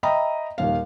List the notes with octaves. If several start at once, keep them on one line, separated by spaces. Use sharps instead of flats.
D#5 E5 G5 A#5 B5 D#6
D#1 D#2 F5